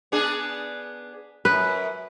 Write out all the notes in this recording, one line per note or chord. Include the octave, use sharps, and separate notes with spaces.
B3 D4 G#4
F#2 B4